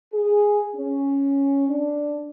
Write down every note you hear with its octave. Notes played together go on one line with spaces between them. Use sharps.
G#4
C#4
D4